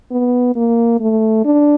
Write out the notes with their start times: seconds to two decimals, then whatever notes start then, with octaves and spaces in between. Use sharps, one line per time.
0.11 B3
0.55 A#3
1.00 A3
1.45 D4